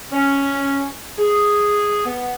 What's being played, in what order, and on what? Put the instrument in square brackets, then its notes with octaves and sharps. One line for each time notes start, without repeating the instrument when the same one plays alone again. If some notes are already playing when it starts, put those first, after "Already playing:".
[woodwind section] C#4
G#4
B3